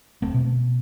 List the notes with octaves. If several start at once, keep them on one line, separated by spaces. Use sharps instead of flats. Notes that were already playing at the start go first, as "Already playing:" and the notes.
E1 A3 C4
B2